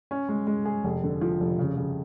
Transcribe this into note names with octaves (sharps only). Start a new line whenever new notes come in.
C#4
G#3
G#3
G#4
F1
D3
F3
F1
C#3
C#3